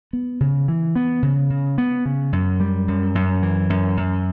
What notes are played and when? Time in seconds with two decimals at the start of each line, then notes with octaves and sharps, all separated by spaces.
0.13 B3
0.40 C#3
0.68 E3
0.96 B3
1.23 C#3
1.50 C#3
1.78 B3
2.06 C#3
2.33 F#2
2.60 G3
2.88 F#2
3.15 F#2
3.43 E3
3.70 F#2
3.97 F#2